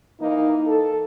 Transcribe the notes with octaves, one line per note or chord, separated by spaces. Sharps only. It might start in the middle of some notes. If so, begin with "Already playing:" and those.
E3 A#3 D#4
A4